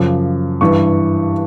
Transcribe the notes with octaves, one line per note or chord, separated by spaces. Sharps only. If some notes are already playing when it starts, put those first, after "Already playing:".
Already playing: F#2 C#3 F3 D6
G2 E3 C#6